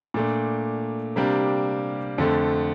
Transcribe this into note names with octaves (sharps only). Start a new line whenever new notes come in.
A#2 A3 D4
C3 G3 A#3 D4 G4
F2 D3 A3